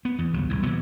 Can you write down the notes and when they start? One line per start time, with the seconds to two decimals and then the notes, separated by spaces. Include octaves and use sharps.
0.05 B3
0.18 E2
0.33 G1 C#2 F#3
0.49 E1 C2 A2
0.63 A#2 E3 B3